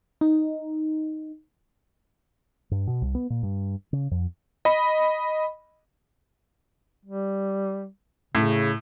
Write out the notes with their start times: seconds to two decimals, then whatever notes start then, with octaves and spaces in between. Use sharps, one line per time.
0.21 D#4
2.71 G2
2.87 B2
3.02 C2
3.15 B3
3.30 A#2
3.43 G2
3.93 C#3
4.11 F2
4.65 D#5 B5
7.06 G3
8.35 A2 C#3